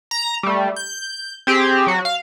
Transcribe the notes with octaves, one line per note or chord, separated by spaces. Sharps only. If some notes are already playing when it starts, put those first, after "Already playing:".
A#5
G3 A3
G6
C4 G4 G#4
F#3 F#4
F5